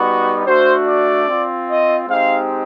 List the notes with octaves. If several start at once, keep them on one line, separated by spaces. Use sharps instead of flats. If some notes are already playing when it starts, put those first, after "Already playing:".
Already playing: G3 B3 D#4 F#4
A3 D4 F#4 C5
D5
C4
F4
D#5
G#3 C4 D#4 G4 F5